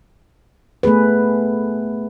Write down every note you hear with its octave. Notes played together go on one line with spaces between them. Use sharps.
A3 B3 G#4 B4